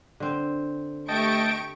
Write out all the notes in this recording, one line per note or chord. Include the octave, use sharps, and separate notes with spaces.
D3 C4
A3 G4 D#5 G5 A5 C#6 D7